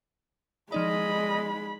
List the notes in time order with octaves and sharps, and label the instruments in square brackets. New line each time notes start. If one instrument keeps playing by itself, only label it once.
[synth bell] F3 D#4 D5 [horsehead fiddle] G#3 B5 [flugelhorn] D#5